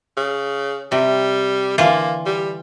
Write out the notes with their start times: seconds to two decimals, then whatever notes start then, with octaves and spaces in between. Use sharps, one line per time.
0.17 C#3
0.92 C3 G3
1.78 D3 E3 A#3 F4
2.26 G3